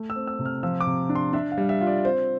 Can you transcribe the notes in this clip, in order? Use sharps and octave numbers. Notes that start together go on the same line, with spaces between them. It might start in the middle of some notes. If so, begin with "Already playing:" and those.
Already playing: A3
E6
C4
E6
C3
F6
F3 E6
D6
C3
D4
C6
D4 E5
F5
G3
E5
F4
D5
C4 C5